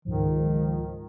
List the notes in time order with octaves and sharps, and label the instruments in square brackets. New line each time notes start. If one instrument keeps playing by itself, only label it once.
[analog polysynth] C#2 G#2 F3 [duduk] D#3